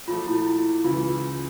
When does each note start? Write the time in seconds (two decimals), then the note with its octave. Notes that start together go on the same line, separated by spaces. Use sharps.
0.08 A#2 F3 A3 F4
0.27 E4
0.47 E4
0.84 C#2 C#3 E3 F4